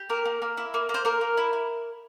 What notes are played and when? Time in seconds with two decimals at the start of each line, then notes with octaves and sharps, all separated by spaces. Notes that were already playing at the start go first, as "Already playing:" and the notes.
Already playing: G4
0.09 A#3 A#4
0.25 A#3
0.42 A#3
0.57 E4
0.74 A#3
0.89 A#3
0.94 C5
1.05 A#3 A#4
1.21 A#3
1.37 E4
1.53 E4